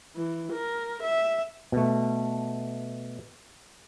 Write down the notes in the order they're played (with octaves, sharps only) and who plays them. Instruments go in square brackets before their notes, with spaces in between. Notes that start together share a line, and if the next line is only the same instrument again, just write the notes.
[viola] E3
A#4
E5
[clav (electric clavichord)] B2 A3